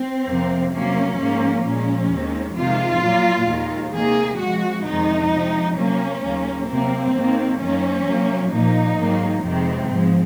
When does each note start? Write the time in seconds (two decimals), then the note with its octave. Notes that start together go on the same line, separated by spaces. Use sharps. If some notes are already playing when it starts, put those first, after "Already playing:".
Already playing: C4
0.27 F2 C3 F3 A#3
0.72 C3 F#3 A#3 C#4
1.18 G#2 F3 A#3
1.64 A#2 F3 G#3 C#4
2.10 D#2 D#3 G#3
2.56 F2 C3 D#3 G#3 F4
3.01 A#2 F#3 A#3
3.47 D#2 D#3 G#3
3.92 C3 D#3 A#3 G#4
4.39 C3 F3 G#3 F#4
4.85 F2 C3 D#3 G#3 D#4
5.30 C3 F3 G#3
5.77 C3 F#3 A#3 C#4
6.22 D#2 C#3 F#3 A#3
6.68 C3 F#3 A#3 C4
7.13 G#2 D#3 A#3
7.59 F#2 D#3 A#3 C#4
8.05 C3 F#3 A#3
8.51 A#2 F3 A#3 D#4
8.97 G#2 D#3 F#3 A#3
9.43 F2 C3 D#3 G#3 C4
9.89 G#2 F3 G#3